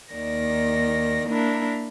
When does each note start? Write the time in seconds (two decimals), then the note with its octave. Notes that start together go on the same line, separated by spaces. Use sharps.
0.14 D#2 D#3 D5 A#6
1.27 A#3 D4 E4 A#4